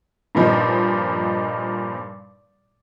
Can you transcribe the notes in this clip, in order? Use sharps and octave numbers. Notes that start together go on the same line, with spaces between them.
G2 A#2 F3 D#4